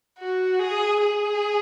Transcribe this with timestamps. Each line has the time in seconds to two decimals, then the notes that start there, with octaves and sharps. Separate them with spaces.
0.19 F#4
0.59 G#4
1.00 G#4